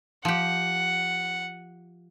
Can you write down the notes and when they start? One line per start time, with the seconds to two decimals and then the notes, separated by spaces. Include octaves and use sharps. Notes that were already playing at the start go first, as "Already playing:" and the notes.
0.25 F3 G4 F#5